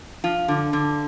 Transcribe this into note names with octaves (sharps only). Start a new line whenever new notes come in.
F3 F4
D3
D3